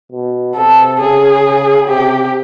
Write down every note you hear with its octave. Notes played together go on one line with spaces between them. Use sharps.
B2
C3 A4
C#3 G#4
C3 G4